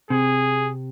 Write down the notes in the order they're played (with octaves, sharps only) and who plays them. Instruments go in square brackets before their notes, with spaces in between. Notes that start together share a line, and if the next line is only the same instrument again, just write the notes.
[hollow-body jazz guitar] C3 [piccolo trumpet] G#4